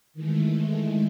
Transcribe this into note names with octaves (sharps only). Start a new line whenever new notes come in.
D#3 E3 G#3 A3